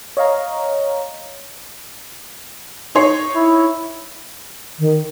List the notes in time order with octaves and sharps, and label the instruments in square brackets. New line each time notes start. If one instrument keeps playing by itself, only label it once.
[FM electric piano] C#5 D#5 F5 A#5
[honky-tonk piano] D#4 C#5 C7
[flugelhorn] E4
[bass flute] D#3